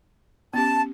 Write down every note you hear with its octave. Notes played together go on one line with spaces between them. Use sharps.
B3 C#4 G4 A5